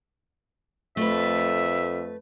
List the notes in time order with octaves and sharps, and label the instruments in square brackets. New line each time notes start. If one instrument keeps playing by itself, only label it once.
[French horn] F2 [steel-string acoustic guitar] A3 B4 [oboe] E5